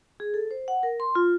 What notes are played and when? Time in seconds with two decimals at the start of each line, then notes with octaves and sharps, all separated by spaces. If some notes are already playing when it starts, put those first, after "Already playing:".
0.20 G#4
0.34 A4
0.51 C5
0.68 F#5
0.83 A#4
1.00 C6
1.15 F4